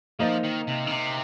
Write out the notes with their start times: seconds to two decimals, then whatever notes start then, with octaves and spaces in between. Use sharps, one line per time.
0.19 F3 A#3 D#4 C5 D#5
0.43 D#3
0.67 C3
0.87 D#3
0.91 C3